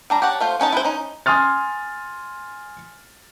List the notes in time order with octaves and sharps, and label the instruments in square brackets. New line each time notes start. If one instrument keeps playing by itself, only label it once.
[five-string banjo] G3 D4 A#5
G4 C#5 F#5 A5
A3 F4 C5
B3 C#4 D#4 A5
E4 B4 C5
C#4 D#4
[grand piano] G#5 C6 D#6 F6 A6